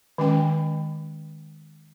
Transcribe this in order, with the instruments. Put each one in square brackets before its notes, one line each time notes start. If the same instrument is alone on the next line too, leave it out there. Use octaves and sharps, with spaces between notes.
[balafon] D#3 G#3 C#4 G5